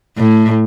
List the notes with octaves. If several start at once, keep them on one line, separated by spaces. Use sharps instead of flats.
A2